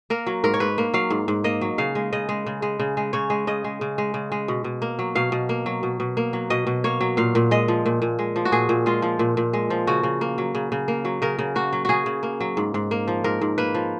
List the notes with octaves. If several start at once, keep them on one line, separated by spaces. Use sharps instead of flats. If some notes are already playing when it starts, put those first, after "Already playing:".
A#3 A#4
F#3
G#2 A#4
C#5
G#2 B4
A#3
F#3 F5
G#2
G#2
A#3 D#5
F#3
C#3 F5
G#3
C#3 D#5
G#3
C#3
G#3
C#3
G#3
C#3 C#5
G#3
C#3 D#5
G#3
C#3
G#3
C#3
G#3
B2
B2
A#3
F#3
B2 F5
B2
A#3
F#3
B2
B2
A#3
F#3
B2 D#5
B2
A#3 C#5
F#3
A#2 F5
A#2
G#3 D#5
F3
A#2
A#2
G#3
F3
F#4
A#2 G#4
A#2
G#3 F4
F3
A#2
A#2
G#3
F3
C#3 F#4
C#3
A#3
F#3
C#3
C#3
A#3
F#3
C#3 A#4
C#3
A#3 F#4
F#3
C#3 F#4 G#4
C#3
A#3
F#3
G#2
G#2
A#3
F3
G#2 A#4
G#2
A#3 B4
F3